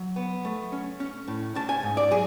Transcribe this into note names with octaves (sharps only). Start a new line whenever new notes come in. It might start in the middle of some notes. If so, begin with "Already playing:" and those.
Already playing: F#3
B3
A3
C#4
C#4
A2
C#4 A5
G#5
G#2
D5
F#3 G#4